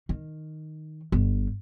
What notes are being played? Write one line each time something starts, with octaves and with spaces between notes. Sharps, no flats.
D#3
G1